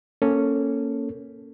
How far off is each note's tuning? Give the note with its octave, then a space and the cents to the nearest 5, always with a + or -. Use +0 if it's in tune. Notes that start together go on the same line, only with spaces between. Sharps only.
A#3 +0 C#4 +0 A4 +10